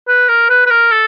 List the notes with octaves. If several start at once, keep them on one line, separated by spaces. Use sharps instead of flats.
B4
A#4
B4
B4
A#4
A4